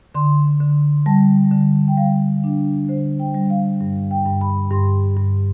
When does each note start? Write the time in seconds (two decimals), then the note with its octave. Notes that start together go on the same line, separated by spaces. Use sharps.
0.15 D3 C6
0.60 D3
1.06 G3 A5
1.51 D3
1.88 G5
1.97 G3 F5
2.44 D4
2.89 D3 C5
3.19 G5
3.34 G3
3.50 F5
3.81 G2
4.11 G5
4.26 G2
4.41 B5
4.71 G2 C6
5.17 G2